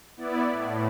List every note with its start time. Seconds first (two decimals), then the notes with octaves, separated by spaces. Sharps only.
0.17 B3 E4 D5
0.51 A2